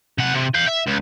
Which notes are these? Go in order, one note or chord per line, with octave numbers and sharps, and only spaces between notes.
C3 F#5
C3
F5 G5
E5
C#2